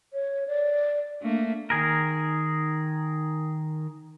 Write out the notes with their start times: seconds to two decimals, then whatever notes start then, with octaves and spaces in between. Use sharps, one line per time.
0.13 C#5
0.47 D5
1.22 A3 A#3 D4
1.70 D#3 G#4 A#4